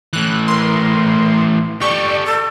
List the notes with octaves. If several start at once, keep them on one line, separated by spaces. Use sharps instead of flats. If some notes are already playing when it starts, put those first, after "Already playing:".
A2 E3 F#6
A#4 C6
G4 A4 D5 C#6
A4